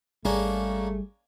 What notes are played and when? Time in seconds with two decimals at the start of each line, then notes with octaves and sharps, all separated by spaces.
0.25 G#1 G3 A3 A#3 C#4 D4 G#4